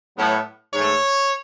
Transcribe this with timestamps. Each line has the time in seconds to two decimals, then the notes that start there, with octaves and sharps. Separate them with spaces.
0.18 A2 F#3 B3
0.74 G#2 E3 A3 C#5